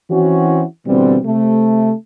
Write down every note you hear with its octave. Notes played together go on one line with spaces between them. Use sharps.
E3 C4 C#4 E4 F#4
B2 D3 E3 G3 C4
C3 A3